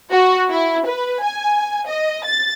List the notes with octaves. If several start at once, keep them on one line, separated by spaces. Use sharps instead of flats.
F#4
E4
B4
G#5
D#5
A6